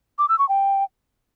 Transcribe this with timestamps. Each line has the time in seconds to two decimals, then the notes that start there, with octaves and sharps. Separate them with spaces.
0.19 D6
0.29 E6
0.39 C#6
0.49 G5